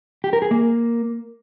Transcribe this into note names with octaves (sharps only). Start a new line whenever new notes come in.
G4
A#4
G#4
A#3